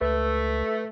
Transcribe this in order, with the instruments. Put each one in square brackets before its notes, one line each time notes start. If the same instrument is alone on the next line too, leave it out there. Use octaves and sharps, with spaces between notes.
[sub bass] C#2 [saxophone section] A3 [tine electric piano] B4